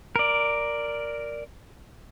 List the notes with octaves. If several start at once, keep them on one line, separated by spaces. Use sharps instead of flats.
A#4 D5